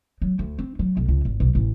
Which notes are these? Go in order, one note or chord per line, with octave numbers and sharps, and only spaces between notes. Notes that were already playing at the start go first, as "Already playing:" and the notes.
F#3
D2
C4
F#3
B1
C#2
G#1
B1
A1